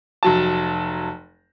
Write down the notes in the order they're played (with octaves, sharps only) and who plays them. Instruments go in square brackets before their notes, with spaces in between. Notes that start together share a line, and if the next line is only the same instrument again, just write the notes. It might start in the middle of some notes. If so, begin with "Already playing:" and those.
[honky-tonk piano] F1 F#3 A5